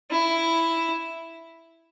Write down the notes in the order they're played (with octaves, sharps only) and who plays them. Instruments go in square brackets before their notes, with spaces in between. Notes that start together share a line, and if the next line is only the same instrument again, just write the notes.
[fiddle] E4